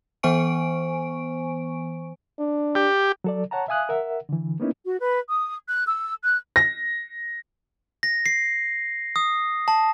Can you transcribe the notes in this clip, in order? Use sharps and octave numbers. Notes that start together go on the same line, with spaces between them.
E3 B3 C5 G#5 C#6 D7
D4
G4
F#3 A4 D5
C#5 F#5 A5 A#5
E5 F5 G#5 D#6 F#6
A#4 E5 F#5
D3 E3
A#3 B3 C#4 D#4 E4
F#4
B4
D#6
F#6
E6
F#6
A#6
A#6
C7
D#6
A5